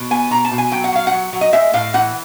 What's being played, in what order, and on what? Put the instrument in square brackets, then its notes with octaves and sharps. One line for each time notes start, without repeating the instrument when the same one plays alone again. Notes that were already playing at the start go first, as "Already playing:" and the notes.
Already playing: [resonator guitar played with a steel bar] B2
B3 G#5
B2 A#5
A5
B2
G#5
F#3 G5
F#5
F#3 F5
F#5
F#3
F#3
D#5
G#3 E5
A2 F5
E3 F#5